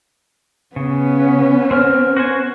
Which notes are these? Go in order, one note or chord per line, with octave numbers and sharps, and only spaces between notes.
C#3 B3 C#4
C4 A#4 F6
F#4 C5 G#5